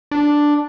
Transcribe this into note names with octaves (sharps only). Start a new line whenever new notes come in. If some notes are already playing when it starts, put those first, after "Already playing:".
D4